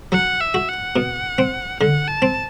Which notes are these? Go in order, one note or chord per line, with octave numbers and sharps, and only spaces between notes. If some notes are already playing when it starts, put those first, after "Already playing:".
F#3 F#5
E5
F#4
F#5
B2
C4
D3 F#5
A5
C4